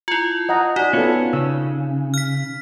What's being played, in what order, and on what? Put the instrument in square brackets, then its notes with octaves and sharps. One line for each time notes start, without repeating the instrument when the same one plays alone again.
[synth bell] E4 F4
[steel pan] D#5 F#5 A#5
[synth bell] D#4 [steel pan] F#4 D5
[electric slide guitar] B3 C#4 [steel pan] F4 A4
[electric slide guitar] C#3 [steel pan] C#5 E6
[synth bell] F6 B6